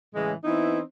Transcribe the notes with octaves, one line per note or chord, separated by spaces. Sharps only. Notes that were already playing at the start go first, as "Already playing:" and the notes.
A2 C#3 E3 G#3
E3 B3 C4 D#4 E4